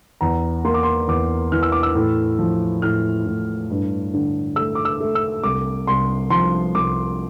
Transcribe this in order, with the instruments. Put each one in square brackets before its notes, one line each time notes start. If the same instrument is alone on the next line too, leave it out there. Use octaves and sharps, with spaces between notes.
[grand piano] E2 A#5
A#3 C6
D6
C6
E2 D6
E3 F6
E6
D6
E6
A2
F3
A2 F6
A2
G2
D3
A3 E6
D6
E6
A3
E6
C2 D6
C2 C6
F3 C6
C2 D6